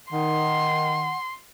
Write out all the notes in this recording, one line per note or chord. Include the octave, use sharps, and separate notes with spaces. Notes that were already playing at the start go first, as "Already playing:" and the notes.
D#3 F#5 C6